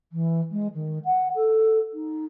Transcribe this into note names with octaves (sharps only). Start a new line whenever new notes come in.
E3
G#3
D#3
F#5
A4
D#4